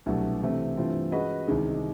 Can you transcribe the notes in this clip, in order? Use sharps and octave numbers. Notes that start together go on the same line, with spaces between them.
C2 B2 F#3 A3 D4
C3 E3 A3 C4
G2 E3 A3 C4 F4
G#3 C#4 F#4 B4 D#5
C2 C3 D#3 G#3